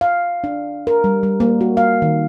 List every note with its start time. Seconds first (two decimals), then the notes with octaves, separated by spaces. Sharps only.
0.01 F5
0.44 D4
0.87 A#4
1.04 G3
1.23 G3
1.40 A#3
1.61 F#4
1.77 F5
2.02 D#3